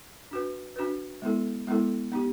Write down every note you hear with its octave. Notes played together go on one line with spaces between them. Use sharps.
D4 F#4 B4
D4 F#4 B4
G#3 B3 E4 A4
G#3 B3 E4 A4
B3 D#4 G4